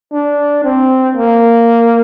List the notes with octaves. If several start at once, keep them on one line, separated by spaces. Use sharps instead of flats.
D4
C4
A#3